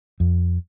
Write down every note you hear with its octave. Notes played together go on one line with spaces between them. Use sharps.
F2